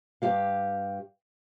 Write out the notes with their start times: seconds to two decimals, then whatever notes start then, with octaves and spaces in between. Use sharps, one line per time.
0.22 G2 G4 F5